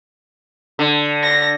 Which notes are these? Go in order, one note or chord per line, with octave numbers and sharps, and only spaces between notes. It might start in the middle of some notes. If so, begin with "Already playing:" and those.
D3
A#6